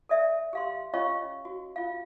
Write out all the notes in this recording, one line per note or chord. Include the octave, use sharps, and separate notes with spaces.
A4 D5 E5
G4 F5 C6
C#4 F4 C#5 D#5 F5 C#6
F#4
F4 F5